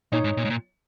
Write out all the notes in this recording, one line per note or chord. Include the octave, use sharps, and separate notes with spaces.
A#2 D#4 C#5 A#5
G#2
A#2
G#2
A#2